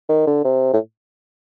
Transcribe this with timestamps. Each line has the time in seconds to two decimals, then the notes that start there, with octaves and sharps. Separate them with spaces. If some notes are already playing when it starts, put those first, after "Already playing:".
0.09 D#3
0.27 D3
0.44 C3
0.73 A2